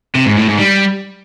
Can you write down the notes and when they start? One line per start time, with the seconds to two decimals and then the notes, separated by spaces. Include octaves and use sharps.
0.15 C3
0.26 G#2
0.37 A2
0.48 G#2
0.58 G3